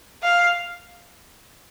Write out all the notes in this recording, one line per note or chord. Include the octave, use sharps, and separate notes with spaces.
F5